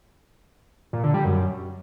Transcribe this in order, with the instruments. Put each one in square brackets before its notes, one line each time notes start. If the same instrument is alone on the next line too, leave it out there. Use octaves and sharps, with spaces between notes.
[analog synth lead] A#2
D3
G3
F#2